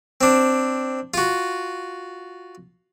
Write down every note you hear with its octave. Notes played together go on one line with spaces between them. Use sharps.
C4 D4
F4 F#4